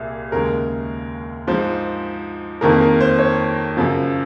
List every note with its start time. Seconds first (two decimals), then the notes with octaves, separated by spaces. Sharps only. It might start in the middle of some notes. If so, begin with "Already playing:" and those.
Already playing: C2 A#2 G#4
0.32 D#2 C#3 G#3 A#4
1.47 G#2 F3 G#3 C5
2.61 F2 D#3 A#3 A#4
2.81 A#4
3.00 C5
3.18 C#5
3.77 F#2 C#3 F3